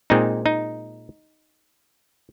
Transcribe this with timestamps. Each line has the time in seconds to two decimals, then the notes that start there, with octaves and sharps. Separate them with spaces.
0.10 A#2 G#3 C4 D#4
0.46 D#4